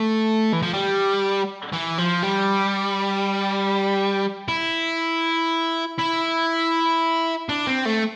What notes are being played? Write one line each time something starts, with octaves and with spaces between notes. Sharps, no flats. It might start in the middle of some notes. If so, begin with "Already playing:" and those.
Already playing: A3
E3
F3
G3
E3
F3
G3
E4
E4
D4
C4
A3